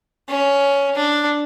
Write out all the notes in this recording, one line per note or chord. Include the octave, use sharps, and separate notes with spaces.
C#4
D4